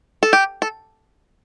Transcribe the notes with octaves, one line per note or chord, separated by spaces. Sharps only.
A4
G4
A4